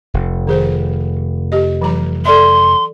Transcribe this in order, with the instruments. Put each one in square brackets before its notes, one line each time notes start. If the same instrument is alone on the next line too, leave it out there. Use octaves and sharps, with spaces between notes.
[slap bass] F1
[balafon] D#3 G#4 C5
G4 D#5
E3 F#3 A#5
[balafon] A4 D5 E5 [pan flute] C6